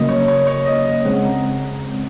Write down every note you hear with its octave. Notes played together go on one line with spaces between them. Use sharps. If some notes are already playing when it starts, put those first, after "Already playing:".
Already playing: C#3 F#3 A#3 D#5
C#5
C#5
C#5
D#5
D#5
C#3 G#3 C4 F#5
A#5